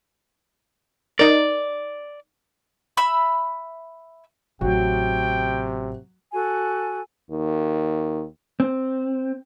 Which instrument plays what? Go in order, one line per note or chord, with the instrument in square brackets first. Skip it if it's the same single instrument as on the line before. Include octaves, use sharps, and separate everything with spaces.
[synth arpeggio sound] D#4 A#4 [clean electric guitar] D5
[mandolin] E5 B5 E6
[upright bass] A1 [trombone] C3 [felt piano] F#3 F#4 [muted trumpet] G5
[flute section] F#4 A4 G#5
[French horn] D#2
[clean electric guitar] C4